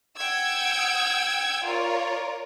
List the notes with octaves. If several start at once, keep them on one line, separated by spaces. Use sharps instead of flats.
F#5 G5 E6 G#6
F4 A#4 C#5 D5